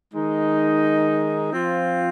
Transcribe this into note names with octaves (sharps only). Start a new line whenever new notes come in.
D#3 G#3 D#4
F3 C4 F4